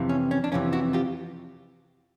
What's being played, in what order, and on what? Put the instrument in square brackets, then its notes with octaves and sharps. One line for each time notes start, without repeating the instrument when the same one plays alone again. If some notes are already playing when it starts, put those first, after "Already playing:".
Already playing: [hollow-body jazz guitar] F2 C3 E3
C#4
C#4
D4
F2 C3 E3 C#4
E4 F#4
F4 G4